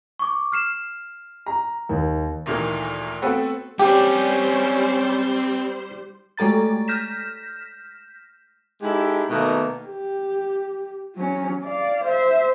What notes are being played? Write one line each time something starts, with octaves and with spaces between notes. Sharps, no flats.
C#6 D6
F6 C7 E7
A#5
D#2
D2 A#2 D#3 E3 A#3
A3 B3 C4 F#4 A4 B4
G3 C4 C#4 G4 B4 C5
G#3 A3 A4 A#5 A6
F6 G6 A#6 B6 E7
G#3 D#4 E4 G4 A4
B2 D#3 A3 A#3
G4
F#3 C#4
D5 F5
C5 E5